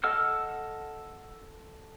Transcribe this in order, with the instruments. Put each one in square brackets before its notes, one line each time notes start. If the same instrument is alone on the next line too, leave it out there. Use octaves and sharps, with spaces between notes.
[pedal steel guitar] A4 D#5 F#5 E6 F6